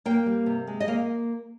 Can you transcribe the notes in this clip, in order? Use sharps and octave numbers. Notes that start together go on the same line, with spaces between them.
A#3 G5
G3
C3
G#3
D#5
A#3 F5